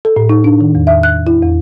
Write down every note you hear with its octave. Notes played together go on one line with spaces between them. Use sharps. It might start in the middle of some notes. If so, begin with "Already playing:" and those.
A4
A2
D#4
D4
D#3
E2
E5
F#6
E4
E2